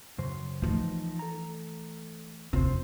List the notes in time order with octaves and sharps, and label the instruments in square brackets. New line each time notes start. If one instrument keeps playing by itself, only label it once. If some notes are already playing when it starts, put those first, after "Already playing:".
[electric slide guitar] F#2 C#3 C5
[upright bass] E3 A3 [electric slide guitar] F3 D#4
[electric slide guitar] A4 A#5
[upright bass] F2 C3 [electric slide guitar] C4 F4 C5